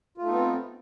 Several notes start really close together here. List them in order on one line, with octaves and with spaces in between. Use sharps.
F4 A3 D#4 B3 C4